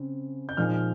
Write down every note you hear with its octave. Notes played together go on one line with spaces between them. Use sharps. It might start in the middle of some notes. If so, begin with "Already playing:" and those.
Already playing: C#3 C4
G6
A#2 F3 G#3 D#4 F6